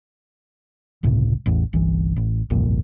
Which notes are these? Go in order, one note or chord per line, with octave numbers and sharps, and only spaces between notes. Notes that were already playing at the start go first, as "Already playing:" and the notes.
G1 C#2 A2 C3
A1 E2
G1 C2 E3
A1
G1 C2 F2 A#2